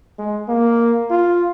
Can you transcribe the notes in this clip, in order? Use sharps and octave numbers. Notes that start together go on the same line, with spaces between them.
G#3
A#3
F4